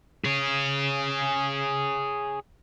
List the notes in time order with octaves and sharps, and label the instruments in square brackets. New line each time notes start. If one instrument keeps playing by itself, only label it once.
[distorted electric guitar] G#4 C#5